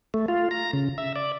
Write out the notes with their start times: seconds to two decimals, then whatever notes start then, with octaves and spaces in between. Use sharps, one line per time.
0.14 A3
0.28 F4
0.51 A#5
0.73 C#3
0.98 E5
1.16 D5